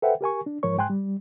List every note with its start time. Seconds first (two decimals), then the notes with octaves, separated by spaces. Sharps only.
0.02 A4 B4 C5 E5 F#5 G5
0.21 G4 A#4 G#5 C#6
0.46 D4
0.63 G#2 F3 A#4 C#5 C#6
0.78 G#2 G5 G#5 C6 F#6
0.90 G3